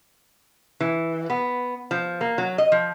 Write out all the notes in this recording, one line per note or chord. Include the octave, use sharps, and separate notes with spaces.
E3
B3
F3
A#3
F#3
D#5
F3